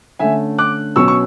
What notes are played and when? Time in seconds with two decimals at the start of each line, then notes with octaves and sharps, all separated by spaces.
0.19 D3 A3 C#4 E5 G#5
0.58 D6 F#6
0.96 B2 F#3 C#4 C#6 E6
1.08 C#6